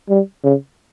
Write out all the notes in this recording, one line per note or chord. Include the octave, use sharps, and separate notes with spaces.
G3
C#3